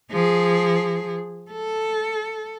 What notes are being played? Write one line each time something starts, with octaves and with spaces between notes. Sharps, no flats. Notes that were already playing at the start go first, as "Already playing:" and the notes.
F3 G#4
A4